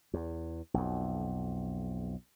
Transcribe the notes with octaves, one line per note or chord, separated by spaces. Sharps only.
E2
B1 F2